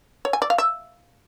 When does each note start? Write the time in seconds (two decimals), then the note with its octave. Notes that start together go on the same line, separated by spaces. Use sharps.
0.25 C#5
0.33 G#5
0.42 D5
0.50 F5
0.58 E5